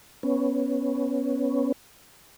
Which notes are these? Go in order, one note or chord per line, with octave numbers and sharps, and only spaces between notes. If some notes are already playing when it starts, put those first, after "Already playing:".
B3 C#4